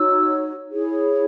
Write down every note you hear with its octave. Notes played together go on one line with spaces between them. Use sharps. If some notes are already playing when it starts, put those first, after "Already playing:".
Already playing: D#4 F#4 C#5 E6
E4 G#4 C#5